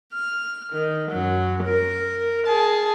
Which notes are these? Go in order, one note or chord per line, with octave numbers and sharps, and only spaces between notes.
F6
D#3
F#2 F#3
A#4
G#4 A5